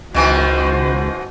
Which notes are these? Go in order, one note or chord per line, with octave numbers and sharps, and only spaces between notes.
C#2 B2 D#3 E3 F#4 C5